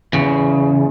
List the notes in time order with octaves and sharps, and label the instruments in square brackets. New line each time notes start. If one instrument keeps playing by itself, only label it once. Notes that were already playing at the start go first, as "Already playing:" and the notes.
[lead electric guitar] E2 C#3